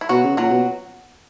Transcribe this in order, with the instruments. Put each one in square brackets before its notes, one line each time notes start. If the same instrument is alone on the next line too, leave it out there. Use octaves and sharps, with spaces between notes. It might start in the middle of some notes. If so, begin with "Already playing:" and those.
[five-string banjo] E4
[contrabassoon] B2 [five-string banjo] F#3 F#4
[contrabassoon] C#3
[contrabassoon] A#2 [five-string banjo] F#3 F#4
[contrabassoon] B2